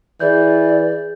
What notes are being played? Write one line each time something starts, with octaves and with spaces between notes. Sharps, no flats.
E3 G#4 D5 G6